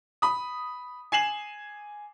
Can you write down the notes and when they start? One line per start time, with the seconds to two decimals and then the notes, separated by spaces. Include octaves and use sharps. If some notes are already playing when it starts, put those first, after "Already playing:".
0.22 B5 D#6
1.12 G#5 C7 E7 F#7